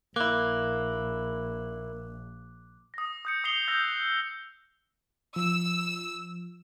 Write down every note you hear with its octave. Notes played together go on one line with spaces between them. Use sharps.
A#1 A#3 E4 D6 F#6 G7
D#6 A#6
D#6 G6 C#7
D#6 C7 F7 G7
E6 F#6 G6 A#6 F7
F3 E6